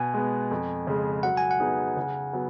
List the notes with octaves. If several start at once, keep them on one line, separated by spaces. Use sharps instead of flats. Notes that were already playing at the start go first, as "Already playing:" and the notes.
Already playing: B2 G#5
G#3 B3
F2
C#3 G#3
F#3 F#5
G#5
F#5
B3 D#4 G#4
C#3
F#3 B3